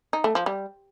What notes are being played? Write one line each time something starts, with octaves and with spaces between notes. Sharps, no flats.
D#4
A3
F3
G3